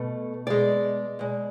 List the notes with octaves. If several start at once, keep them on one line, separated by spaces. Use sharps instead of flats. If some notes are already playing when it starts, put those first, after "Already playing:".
Already playing: B2 A3
B2 G#3 D5
B2 G#3